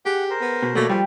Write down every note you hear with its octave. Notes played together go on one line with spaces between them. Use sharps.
G4 G#4 F#5
A#4 C5
B3
B2
B2 F#3 A3 A#3 C#5 D5 E5
F3 G3 G5